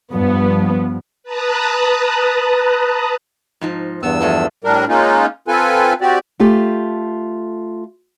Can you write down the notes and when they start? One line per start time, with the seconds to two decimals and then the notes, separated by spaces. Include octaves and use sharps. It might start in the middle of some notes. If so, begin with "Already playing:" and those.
0.13 G2 F3 B3
1.23 B4 A5 A#5 D#6 F#6
3.61 G#2 F3 D#4
4.03 E2 G2 B3 E6
4.21 F3 G#3 A3
4.64 A2 G3 D4 A#4
4.89 G#3 A#3 C#4 D#4 F4
5.48 C4 F4 A4 B4 G#5
6.01 C4 F#4 G4 D5
6.40 A3 F4 G4 A4